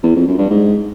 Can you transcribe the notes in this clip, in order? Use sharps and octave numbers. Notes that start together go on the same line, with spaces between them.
E2
F2
F#2
G2
G#2